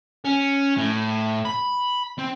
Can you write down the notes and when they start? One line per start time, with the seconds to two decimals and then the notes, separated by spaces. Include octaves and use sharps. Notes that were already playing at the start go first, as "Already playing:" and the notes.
0.25 C#4
0.77 A2
1.45 B5
2.19 C4